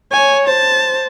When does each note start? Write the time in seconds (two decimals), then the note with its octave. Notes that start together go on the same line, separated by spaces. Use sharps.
0.12 C#5 G#5
0.47 C5 A5